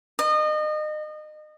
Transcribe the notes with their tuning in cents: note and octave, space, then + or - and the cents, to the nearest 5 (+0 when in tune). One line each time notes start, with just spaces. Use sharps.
D#5 -30